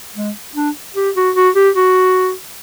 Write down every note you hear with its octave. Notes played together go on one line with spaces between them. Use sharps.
G#3
D4
G4
F#4
F#4
G4
F#4